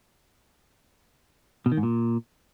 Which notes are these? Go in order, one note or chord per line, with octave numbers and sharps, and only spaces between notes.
B2
D#3
G#2
A#2